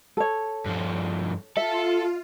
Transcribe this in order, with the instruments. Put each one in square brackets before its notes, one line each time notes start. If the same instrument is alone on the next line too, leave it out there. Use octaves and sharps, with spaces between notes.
[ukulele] A4 C#5
[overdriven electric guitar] G2 F3
[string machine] F4 [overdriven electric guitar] A4 [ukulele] E5